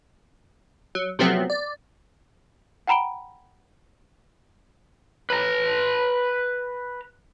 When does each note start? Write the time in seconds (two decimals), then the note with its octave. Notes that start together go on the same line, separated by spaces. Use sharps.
0.95 F#3
1.19 C3 F3 F#3 A3 B3 C4
1.50 D5
2.87 F#5 G5 A#5 B5 D7 G7
5.30 B4 A#5